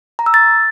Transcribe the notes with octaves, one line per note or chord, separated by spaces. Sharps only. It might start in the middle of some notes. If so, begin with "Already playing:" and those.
A#5
E6
A6